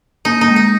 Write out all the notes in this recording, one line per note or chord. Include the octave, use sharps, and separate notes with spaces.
A#3 D#4
D#4
G#3
D#4